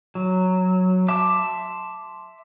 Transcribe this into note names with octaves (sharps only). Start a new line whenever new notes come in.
F#3
E5 A5 C6 D6